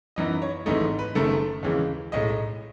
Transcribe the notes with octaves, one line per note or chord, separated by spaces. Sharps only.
F#2 E3 B3 D#4 D#5
C#5
G#1 G#2 E3 A3 D#4 D#5
B4
F#1 F#2 D#3 A3 A4
D#2 C#3 E3 G#3
B1 A2 G#3 D#5